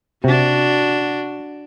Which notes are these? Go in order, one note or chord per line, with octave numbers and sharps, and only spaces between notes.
C3 D4 F#4